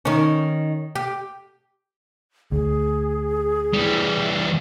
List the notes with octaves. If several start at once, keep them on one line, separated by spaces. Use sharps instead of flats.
D#3 C#4
G4
D2 G#4
E3 G3